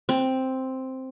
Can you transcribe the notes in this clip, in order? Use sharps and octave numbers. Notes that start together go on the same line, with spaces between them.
C4